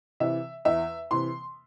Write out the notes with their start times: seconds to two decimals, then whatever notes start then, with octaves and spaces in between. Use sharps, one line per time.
0.20 C3 E3 E5
0.65 E2 E5
1.11 C3 E3 C6